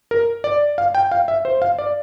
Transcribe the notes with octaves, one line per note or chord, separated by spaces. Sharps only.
A#4
D5
F5
G5
F5
E5
C5
F5
D5